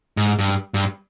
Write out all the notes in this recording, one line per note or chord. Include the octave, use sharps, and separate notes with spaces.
G#2
G2
G2